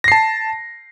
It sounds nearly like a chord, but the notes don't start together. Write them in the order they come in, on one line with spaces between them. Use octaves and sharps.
A#6 C7 A5